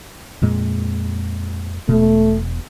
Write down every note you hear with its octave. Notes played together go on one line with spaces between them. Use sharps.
F2 A#2 G#3
E1 B2 A3